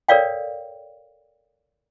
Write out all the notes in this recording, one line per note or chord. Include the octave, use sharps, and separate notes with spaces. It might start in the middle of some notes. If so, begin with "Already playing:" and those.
A4 A#4 C#5 D5 F5 G5